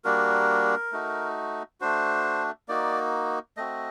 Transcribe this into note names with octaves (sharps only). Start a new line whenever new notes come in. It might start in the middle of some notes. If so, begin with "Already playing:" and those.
G3 A#3 D4 F#4 A#4
A3 D#4 F#4
A3 D4 F#4 C5
A#3 D#4 F#4 D5
A3 C4 F#4 D#5